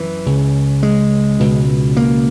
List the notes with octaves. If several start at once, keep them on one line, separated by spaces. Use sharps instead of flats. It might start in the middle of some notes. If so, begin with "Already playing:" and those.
Already playing: F#2 E3
C#2 C#3
G#3
C#2 B2
A#3